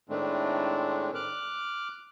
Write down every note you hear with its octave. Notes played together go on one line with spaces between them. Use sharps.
A2 D#3 G#3 A3 C4 D4
D6 F6 F#6